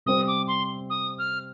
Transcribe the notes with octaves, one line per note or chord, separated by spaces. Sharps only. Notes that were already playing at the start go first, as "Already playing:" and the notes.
C3 G3 C4 G4 D#6
D6
C6
D#6
F6